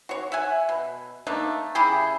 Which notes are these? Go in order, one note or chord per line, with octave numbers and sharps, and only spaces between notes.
F#4 C#5
E5 F#5 G#5
B2
A3 A#3 D4 D#4
C#3 E4 G4 G#4